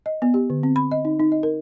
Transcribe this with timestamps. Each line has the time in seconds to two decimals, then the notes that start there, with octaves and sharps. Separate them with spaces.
0.06 D#5
0.22 B3
0.34 G4
0.50 D3
0.63 C4
0.76 B5
0.92 D#5
1.05 D#4
1.20 D#4
1.32 D#5
1.43 A#4